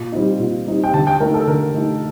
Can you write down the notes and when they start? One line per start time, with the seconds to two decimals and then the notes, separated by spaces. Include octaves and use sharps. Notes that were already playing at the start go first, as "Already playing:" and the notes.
Already playing: A#2
0.12 G3 C4 D#4
0.40 A#2
0.67 G3 C4 D#4
0.84 G5
0.94 D3 A5
1.07 G5
1.20 A3 D#4 A#4
1.34 A4
1.47 D3 A#4
1.75 A3 D#4